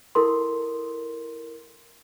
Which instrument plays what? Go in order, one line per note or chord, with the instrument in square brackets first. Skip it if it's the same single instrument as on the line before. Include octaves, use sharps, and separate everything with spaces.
[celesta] E4 A4 A#4 C6